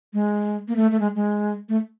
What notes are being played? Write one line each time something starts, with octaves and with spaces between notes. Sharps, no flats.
G#3
A#3
A3
A3
G#3
G#3
A3